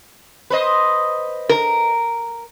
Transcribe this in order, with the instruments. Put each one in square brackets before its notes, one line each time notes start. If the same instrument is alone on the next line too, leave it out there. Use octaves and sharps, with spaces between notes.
[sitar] B4 C5 D#5
[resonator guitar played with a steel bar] A#4